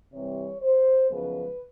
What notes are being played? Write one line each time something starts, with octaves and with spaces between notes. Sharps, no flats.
C3 E3 G3 C4 C#5
C5
F#2 C#3 F3 G#3 B3 B4